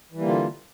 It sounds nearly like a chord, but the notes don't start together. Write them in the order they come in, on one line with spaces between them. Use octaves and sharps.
E3 G3 A#3 D3 F4